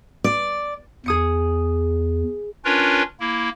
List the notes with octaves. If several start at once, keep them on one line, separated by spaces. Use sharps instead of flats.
D5
E2 G#4 D#6 C#7
C#4 D4 F4 A#4 B4 C#5
A#3 E4